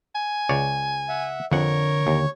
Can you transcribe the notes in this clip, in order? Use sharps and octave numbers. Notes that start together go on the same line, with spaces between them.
G#5
C#2 C#5 D5
E5 F#5
F2 D3 D4 A#4 C#5 F#5 C#6
D#2